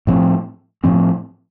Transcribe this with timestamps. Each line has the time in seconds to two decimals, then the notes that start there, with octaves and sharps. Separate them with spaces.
0.07 A2 F3 C4
0.84 A2 F3 C4